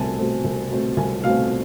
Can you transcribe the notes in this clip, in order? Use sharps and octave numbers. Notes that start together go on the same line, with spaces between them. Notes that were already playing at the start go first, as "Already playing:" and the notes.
Already playing: C2 B2 A3 C4 G#5 A5
B2 A3 C4
C2
B2 A3 C4
C2 G#5
B2 A3 C4 F5